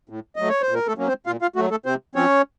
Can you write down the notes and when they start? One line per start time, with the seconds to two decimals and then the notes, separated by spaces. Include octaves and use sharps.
0.09 A2
0.36 F#3 A3 D#5
0.49 C#5
0.62 C5
0.68 A#2
0.74 A#4
0.87 A3 A4
0.97 F#3 A#3 C#4
1.08 C4 C5
1.26 A#2 F4 F5
1.42 F4 F5
1.56 F#3 A3 F#4
1.71 A3 A4
1.85 C3 C4 C5
2.15 F3 C4 C#4 C#5